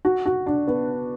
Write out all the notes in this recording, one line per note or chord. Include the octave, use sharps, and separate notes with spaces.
F#4
F#4
D4
B3